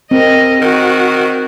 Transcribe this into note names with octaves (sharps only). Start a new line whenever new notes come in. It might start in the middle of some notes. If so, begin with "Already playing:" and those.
C4 A#4 D#5
D#3 F#4